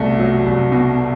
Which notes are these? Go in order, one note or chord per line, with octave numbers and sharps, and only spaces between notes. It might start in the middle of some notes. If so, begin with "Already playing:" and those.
Already playing: C2 B2 A3
F#3
C2
B2